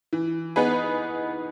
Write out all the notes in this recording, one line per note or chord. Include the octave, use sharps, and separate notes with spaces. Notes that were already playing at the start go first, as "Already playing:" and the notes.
E3
B3 D#4 G#4 B4